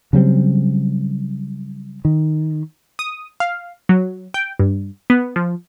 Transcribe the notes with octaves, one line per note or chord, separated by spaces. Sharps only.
C#3 F#3 G3 C4
D#3
D#6
F5
F#3
G5
G2
B3
F3